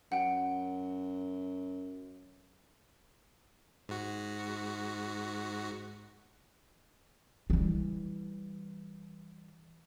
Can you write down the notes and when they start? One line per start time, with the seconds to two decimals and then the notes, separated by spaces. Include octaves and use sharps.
0.12 F#2 F#5 G5
3.89 G#2 F#4
7.50 E3 G3